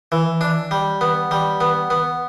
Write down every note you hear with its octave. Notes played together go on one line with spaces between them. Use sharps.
E3
D4
G3
B3
G3
B3
B3